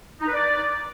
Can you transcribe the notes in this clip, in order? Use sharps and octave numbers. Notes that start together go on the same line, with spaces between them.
D#4
B4
D5